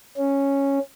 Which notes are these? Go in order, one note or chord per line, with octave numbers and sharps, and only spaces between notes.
C#4